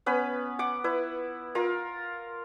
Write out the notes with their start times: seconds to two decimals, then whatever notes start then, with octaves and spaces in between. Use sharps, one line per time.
0.06 B3 C#4 B4 B5
0.59 F#5 D6
0.84 E4 B4
1.55 F4 A#4